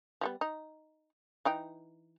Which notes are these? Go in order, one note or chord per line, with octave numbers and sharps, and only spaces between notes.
F3 G3 B3
D#4
E3 D#4 G5